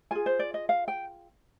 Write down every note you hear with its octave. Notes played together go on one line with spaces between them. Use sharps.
F4 G#4 G#5
C5
D5
D#5
F5
G5